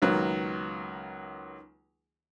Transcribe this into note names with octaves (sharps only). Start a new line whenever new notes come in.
C#2 D#3 F#3 A#3 B3